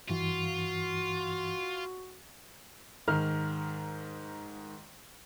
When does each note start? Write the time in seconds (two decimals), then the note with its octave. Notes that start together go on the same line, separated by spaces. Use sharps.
0.10 G2 E3 F4 F#4
3.08 G#2 D#3 A#5 F6